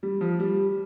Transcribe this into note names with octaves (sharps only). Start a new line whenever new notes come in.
G3
F3
G3